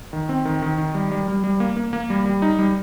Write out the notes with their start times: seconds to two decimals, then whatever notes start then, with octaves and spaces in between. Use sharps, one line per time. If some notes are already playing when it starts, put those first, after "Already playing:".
0.13 D#3
0.29 C4
0.45 D#3
0.62 D#3
0.78 D#3
0.94 G3
1.12 G3
1.28 G3
1.44 G3
1.60 A#3
1.77 A#3
1.93 A#3
2.10 G3
2.26 G3
2.42 D#4
2.59 G3